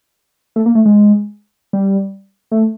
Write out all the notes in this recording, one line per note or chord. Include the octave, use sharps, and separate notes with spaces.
A3
A#3
A3
G#3
G3
A3